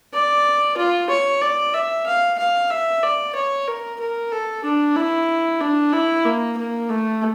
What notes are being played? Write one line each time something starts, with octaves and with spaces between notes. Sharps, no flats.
D5
F4
C#5
D5
E5
F5
F5
E5
D5
C#5
A#4
A#4
A4
D4
E4
D4
E4
A#3
A#3
A3